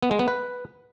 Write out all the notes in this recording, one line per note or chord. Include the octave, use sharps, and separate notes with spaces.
B3
G#3
B3
B4